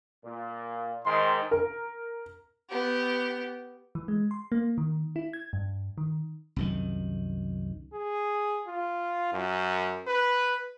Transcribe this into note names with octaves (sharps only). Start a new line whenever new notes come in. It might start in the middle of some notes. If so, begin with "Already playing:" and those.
A#2
G#2 D#3 C6
A#4
B3 G4
E3
G#3
C6
A#3
D#3
E4
G#6
G2
D#3
C2 F#2 D#3
G#4
F4
F#2
B4